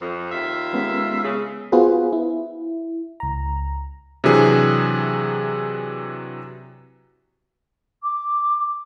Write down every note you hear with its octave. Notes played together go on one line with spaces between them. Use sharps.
F2
D#2 F4 E5
G#3 B3 C#4
C#3
B3 F4 F#4 G#4 B4 C5
E4
C#2 A#5
C3 E3 F#3 D4 G#4
D6